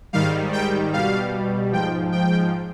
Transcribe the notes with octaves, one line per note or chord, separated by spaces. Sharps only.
G#2 D#3 G3 F5
G5
B2 G3 F5
G#2 F3 G5
G5